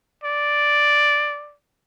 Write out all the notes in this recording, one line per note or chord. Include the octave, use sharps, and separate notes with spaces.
D5